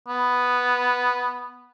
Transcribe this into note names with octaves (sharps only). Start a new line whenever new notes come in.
B3